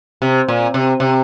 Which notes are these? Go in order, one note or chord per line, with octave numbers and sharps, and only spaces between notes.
C3
A#2
C3
C3